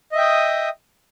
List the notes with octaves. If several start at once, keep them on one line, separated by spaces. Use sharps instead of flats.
D#5 E5 G5 D#6